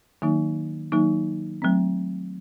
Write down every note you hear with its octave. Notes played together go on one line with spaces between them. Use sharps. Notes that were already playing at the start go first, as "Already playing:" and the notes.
D#3 F#3 A#3 D#4
D#3 F#3 A#3 D#4
F#3 A3 C4